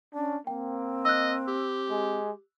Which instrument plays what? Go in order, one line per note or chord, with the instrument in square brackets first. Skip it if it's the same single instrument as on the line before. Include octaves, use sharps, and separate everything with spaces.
[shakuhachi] C#4 [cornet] D4
[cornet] A#3 [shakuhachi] C4 [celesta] G5
[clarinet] D#5 [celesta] E6 F#6
[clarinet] G4
[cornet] G#3